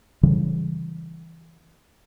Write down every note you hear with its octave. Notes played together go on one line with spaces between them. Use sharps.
C#3 E3 G3